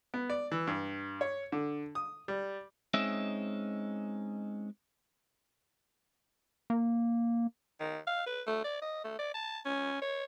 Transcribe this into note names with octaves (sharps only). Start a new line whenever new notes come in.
B3
D5
E3
G2
C#5
D3
D#6
G3
G#3 C4 C#4 D#4 E5
A#3
D#3
F5
B4
A3
D5
D#5
A3
D5
A5
C#4
C#5